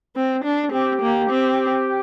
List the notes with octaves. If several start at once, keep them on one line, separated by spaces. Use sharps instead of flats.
C4
D4
C4 G4
A#3
C4